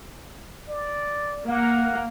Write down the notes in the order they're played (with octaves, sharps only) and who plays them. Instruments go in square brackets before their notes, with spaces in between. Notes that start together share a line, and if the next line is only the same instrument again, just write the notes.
[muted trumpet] D5
[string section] A#3 [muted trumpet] F#5